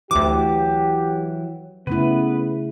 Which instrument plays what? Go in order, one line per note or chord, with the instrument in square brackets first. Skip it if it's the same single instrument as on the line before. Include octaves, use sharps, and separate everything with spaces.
[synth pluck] D2 D6 [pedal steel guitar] E3 F#3 [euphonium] G4
[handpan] C#3 A3 E4 [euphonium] B3 [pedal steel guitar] B4